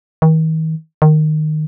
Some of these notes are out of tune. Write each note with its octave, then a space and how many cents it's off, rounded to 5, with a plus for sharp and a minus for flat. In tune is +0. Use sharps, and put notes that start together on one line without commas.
D#3 +40
D#3 -15